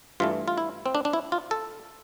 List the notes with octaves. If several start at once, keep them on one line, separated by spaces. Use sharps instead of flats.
G2 E3 A3 F4
F4
E4
C4
D4
D4
E4
F4
A4